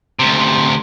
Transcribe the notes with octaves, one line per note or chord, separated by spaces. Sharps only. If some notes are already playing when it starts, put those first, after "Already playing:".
D2 C3